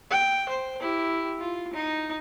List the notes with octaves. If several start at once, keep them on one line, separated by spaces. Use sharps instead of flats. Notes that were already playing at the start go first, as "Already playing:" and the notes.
G5
C5
E4 G4
F4
D#4